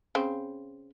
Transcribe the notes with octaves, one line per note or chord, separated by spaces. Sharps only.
C#3 C4